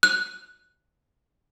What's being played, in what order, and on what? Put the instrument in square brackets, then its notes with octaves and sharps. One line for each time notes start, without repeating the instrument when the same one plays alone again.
[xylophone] F#6